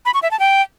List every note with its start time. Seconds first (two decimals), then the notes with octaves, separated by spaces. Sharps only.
0.05 B5
0.14 C#6
0.22 E5
0.31 A5
0.40 G5